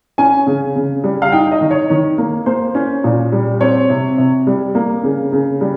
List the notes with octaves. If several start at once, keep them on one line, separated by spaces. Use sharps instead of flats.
C#4 G#5
C#3
C#3
G3
F5
D#4 G5
D#5
D#3
C#5
D#3
A#3
A#3 C5
C#4
A#2
G3
C4 C#5
C3
C3
G3
A#3
C#3
C#3
G3